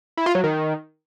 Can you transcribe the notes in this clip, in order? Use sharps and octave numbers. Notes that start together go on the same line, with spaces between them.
E4
F4
F#3
D#3